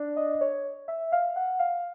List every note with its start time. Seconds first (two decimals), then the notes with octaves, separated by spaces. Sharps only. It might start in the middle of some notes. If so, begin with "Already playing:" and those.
Already playing: D4
0.16 D#5
0.41 C#5
0.88 E5
1.12 F5
1.36 F#5
1.59 F5